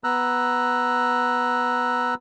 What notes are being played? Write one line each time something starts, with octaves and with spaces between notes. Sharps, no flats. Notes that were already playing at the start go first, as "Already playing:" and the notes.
B3 A#5 E6 F#6